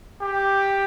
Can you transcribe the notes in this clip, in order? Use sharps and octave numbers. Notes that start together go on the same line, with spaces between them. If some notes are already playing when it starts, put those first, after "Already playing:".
G4